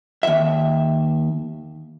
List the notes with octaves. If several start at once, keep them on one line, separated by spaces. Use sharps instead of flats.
D#2 E5